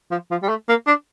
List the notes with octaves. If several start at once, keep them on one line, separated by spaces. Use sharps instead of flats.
F3
F3
G3
A3
A#3
D4